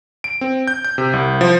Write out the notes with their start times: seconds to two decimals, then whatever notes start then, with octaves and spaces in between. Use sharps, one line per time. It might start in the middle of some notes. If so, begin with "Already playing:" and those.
0.24 D7
0.41 C4
0.67 G6
0.84 G6
0.98 C3
1.13 C2
1.41 F3